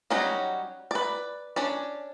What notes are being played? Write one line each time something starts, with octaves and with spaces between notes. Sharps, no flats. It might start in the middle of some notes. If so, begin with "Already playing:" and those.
F#3 G3 C#4 D#4 F#4
B4 D5
C#4 D4 D5